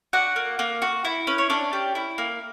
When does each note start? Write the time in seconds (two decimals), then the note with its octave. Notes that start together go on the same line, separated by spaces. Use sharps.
0.13 D4 F#4 F#5
0.36 A#3
0.59 A#3
0.82 F#4
1.05 E4
1.27 C#4 B4
1.38 C#5
1.50 C#4 D4 D5
1.73 G4
1.95 E4
2.18 A#3